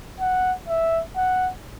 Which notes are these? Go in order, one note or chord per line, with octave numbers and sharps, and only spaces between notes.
F#5
E5
F#5